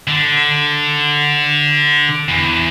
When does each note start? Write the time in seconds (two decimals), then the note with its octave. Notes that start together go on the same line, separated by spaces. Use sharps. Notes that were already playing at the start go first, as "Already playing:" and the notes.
0.08 D3
2.29 E2